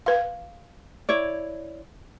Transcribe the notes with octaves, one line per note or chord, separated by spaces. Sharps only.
B4 F5
E4 C#5 D5